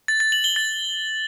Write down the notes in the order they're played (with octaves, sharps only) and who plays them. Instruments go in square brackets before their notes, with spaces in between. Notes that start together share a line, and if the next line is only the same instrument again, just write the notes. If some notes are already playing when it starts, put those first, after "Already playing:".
[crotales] A6
A6
F#7
G7
A6